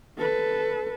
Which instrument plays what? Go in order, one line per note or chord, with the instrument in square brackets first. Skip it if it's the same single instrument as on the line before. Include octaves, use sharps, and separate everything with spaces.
[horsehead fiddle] A4 B4